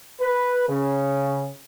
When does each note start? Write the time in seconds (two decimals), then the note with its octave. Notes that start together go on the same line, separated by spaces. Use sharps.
0.21 B4
0.68 C#3